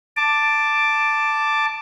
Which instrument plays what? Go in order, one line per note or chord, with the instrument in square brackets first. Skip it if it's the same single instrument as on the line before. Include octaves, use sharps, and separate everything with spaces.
[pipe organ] A5 D6